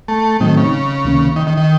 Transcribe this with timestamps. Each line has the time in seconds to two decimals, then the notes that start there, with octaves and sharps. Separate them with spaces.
0.08 A3
0.40 A2 D#3 F#3 A3 C4 D#4
0.57 C#3
1.04 C#2 C3 D#3 A#3 C#4
1.36 D#3
1.47 D#3
1.57 D#3